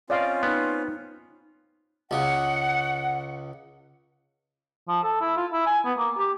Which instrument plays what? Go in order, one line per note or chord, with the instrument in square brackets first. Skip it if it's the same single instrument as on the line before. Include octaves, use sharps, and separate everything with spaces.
[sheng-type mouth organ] C4 C#4 F4 [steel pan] D5 D#5 F5
[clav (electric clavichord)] B3 [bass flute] D#4
[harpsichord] C#2 C#3 [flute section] F#5
[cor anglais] F3
A4
E4
F4
E4
G#5
B3
A#3
G4